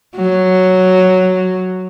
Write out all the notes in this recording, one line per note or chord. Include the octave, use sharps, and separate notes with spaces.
F#3